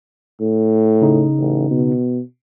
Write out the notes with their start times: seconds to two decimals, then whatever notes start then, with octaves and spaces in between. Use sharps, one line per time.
0.41 A2
1.02 C#3 D#4
1.39 A1
1.70 B2